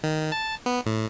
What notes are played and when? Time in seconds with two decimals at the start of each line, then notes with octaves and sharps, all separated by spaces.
0.04 D#3
0.32 A5
0.66 B3
0.86 A2